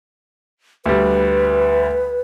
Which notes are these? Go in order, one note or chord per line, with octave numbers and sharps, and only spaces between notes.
D2 G3 B4